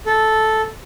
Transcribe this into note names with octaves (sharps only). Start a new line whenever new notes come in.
A4